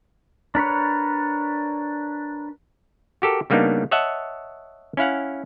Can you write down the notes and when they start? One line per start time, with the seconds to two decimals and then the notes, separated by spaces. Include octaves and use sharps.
0.55 D4 A#4 B4 C#5
3.22 F#4 G4 A4 A#4
3.50 C#3 G3 A#3 B3 D4 D#4
3.91 C#5 D#5 E5 F#5 A5
4.97 C#4 E4 F5 F#5